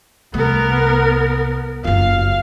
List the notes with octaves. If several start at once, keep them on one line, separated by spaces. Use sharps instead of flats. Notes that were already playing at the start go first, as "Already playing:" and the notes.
C2 A3 B3 A#4
F#1 F4 F5